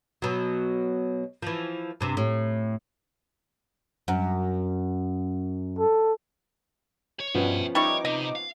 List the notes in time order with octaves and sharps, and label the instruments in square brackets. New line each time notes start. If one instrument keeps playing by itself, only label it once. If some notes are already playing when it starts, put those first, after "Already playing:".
[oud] B2 F#3
E3 F3
G2 C3
A2
F#2
[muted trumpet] A4
[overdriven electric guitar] C#5
[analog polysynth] G2 B2 [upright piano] F3 B3 C#4 [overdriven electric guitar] E5 G5
[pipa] G3 E4 C#6 [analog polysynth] D#4 D6 [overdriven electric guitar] C#5
[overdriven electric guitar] C3 [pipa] D#5
[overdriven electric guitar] F5